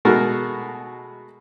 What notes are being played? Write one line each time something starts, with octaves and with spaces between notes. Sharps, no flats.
B2 G#3 A3 F#4 A4 A#4